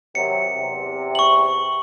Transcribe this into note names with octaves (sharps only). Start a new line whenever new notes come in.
C3 D#3 F#3 C#7
E2 C3
C#6 F#7